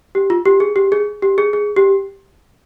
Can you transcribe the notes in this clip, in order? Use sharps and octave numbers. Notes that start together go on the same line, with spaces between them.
G4
F4
G4
G#4
G4
G#4
G4
G#4
G#4
G4